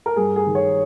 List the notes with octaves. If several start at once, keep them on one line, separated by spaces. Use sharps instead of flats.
A#4
G2 G#4
G#4
D#3
C#5